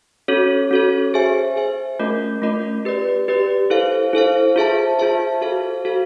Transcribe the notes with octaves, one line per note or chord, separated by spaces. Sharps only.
C#4 F#4 A4 C#5
C#4 F#4 A4 C#5
G#4 C5 E5 G#5
G#4 C5 E5 G#5
A3 C#4 F4 A#4 D#5
A3 C#4 F4 A#4 D#5
G4 B4 D5
G4 B4 D5
E4 A4 C5 F5
E4 A4 C5 F5
F4 G#4 C5 E5 A5
F4 G#4 C5 E5 A5
F#4 A4 C5 F5
F#4 A4 C5 F5